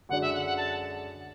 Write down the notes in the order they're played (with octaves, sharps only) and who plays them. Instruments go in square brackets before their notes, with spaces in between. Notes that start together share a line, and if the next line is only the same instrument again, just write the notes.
[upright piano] F#2 D3 G#3 D4 F#4 [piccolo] F#5
[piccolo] E5
F#5
F#5
A5